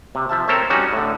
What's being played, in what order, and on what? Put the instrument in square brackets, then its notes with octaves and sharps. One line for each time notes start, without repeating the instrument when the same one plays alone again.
[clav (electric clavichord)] C3
F3 E5 A5
C4 A4 A#4 C5 C#5 E5
G3 C#4 D#4 F#4
A2 D3